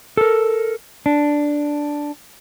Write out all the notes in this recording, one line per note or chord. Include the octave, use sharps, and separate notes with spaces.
A4 A#4
D4